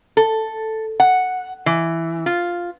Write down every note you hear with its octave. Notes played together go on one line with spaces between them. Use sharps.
A4
F#5
E3
F4